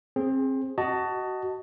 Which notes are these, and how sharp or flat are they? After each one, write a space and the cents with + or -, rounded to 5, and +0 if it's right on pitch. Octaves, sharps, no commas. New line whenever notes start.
C4 +25 G#4 +0
F#4 +20 D#5 +0 A5 +15